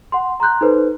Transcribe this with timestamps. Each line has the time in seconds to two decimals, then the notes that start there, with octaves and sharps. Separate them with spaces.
0.12 F#5 C6
0.40 A#5 C6 F#6 G6
0.61 D#4 A4 B4 C5